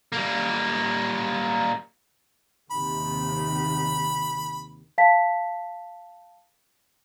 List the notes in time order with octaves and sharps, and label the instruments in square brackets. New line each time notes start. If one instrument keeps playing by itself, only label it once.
[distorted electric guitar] G3 A#3
[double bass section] D#2 C3 D#3 [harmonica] B5
[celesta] F5 A5 B6